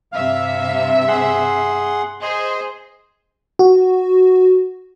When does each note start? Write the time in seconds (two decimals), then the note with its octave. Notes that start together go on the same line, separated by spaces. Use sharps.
0.12 G2 C3 E5 F5
1.08 G#4 F#5 C6
2.22 G#4 C5 D#5 C6
3.59 F#4